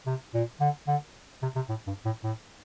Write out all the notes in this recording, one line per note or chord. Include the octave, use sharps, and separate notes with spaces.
C3
A#2
D3
D3
C3
C3
A2
G2
A2
A2